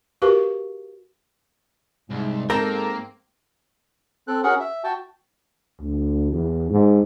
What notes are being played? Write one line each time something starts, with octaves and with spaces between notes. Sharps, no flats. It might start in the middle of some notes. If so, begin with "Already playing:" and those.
F#4 G4 A#4 B4 F5 C#6
C2 G#2
A#3 C4 A4 A#4 G5
C4 A4 F#6
C#4 F#4 G#4 A#4 F#5 F#6
E5
F#4 G5 A5
D2
E2
G#2